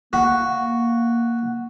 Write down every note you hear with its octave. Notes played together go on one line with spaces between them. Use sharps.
A#3 F#4